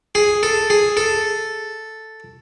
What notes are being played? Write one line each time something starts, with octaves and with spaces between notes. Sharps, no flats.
G#4
A4
G#4
A4